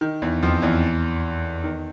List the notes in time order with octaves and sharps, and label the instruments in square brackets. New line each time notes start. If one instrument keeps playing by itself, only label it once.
[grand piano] D#3
E2 E3
F2 F3
E2 E3
D#3